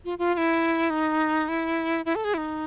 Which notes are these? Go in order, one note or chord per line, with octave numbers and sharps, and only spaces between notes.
F4
F4
F4
E4
D#4
E4
E4
A4
G#4
E4
D#4